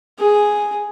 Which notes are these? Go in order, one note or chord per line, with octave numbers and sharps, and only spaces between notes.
G#4